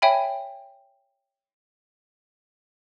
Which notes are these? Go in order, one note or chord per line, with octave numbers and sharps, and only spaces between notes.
C#5 E5 G5 G#5 B5